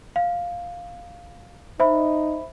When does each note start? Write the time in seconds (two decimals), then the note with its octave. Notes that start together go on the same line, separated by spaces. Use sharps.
0.16 F5
1.80 D#4 C5 E5 B5